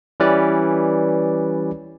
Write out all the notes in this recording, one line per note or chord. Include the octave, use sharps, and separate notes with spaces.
E3 G3 C#4 B4 D5